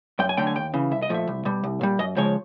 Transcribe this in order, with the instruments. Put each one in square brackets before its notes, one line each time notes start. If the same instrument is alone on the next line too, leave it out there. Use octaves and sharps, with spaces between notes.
[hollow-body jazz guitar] F#2 G5
G#5
D3 F#3 A3 G5
G#5
D#2 G5
C#3 E3
C2 E5
D#5
A#2 F3 A3 E5
C2
B2 G3
C2
A#2 G3
F#2 D#5
C#3 F3 G#3 C#5